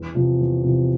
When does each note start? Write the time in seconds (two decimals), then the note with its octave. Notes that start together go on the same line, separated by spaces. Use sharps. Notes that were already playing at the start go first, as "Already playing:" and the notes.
Already playing: E2
0.15 C3 F3
0.39 E2
0.64 C3 F3